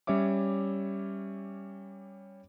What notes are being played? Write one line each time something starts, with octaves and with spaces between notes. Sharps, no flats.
G3 C#4 C#5 E5 D6